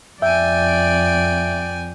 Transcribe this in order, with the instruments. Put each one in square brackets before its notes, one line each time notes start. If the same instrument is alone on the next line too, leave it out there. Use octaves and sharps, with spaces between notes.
[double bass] F2 [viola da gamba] D5 [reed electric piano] E5 [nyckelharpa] G5 G#5